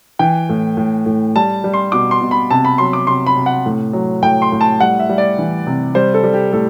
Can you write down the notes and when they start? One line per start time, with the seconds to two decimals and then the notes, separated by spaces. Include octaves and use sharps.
0.19 E3 G5
0.49 A2
0.77 A2
1.06 A2
1.36 G3 A5
1.64 G3
1.74 C6
1.92 B2 D6
2.11 C6
2.21 B2
2.31 B5
2.51 C3 A5
2.65 B5
2.78 F#3 C6
2.93 D6
3.07 C3 C6
3.27 B5
3.36 C3
3.46 F#5
3.66 A2
3.93 F#3
4.22 A2 G5
4.42 C6
4.52 A2
4.61 A5
4.80 G3 F#5
4.99 E5
5.09 G3
5.18 D5
5.38 E3
5.67 C3
5.95 G3 C5
6.14 A4
6.23 G3
6.34 G4
6.53 A2 A4